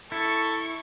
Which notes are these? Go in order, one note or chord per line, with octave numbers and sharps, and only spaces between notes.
E4 A4 C#6